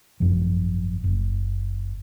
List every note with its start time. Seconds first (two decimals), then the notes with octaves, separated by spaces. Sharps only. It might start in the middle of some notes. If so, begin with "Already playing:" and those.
0.20 G#1 F#2 F3
1.04 F#1